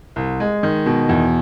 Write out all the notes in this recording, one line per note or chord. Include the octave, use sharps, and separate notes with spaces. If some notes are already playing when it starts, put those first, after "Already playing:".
C2
G#3
D#3
B2
E2